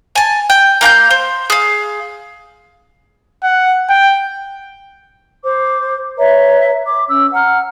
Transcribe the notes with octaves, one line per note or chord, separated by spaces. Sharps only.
G#5 A5
G5
A#3 F5 A5 G6
C5
G#4 F5
F#5
G5
C5 D6
B4 C#5 E5 A#5
D6
C#4 E6
F#5 A#5 F6